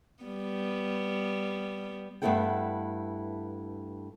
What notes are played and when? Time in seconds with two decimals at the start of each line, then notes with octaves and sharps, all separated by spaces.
0.23 G3 B3
2.22 G2 A3 B3 E4 A4 G5